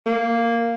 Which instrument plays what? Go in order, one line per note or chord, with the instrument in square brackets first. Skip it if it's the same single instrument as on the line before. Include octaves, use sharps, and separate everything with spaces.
[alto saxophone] A#3